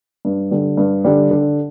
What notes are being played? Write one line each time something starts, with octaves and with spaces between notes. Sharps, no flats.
G2
D3 G3
G2
D3 G3
D3